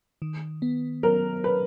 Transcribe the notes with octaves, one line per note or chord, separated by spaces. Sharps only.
D#3
B3
F#3 A#4
B4